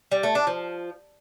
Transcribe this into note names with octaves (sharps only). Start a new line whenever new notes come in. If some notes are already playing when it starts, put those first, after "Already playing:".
G3
A3
D4
F3